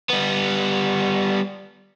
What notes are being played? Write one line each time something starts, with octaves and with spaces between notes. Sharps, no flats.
G3 B3